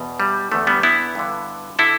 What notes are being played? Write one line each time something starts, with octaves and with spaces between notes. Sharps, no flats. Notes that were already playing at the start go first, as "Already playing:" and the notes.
Already playing: E2 B2
G3
E2 D3 A3
G3 B3
B3 E4
G2 D3
D3 E4 A4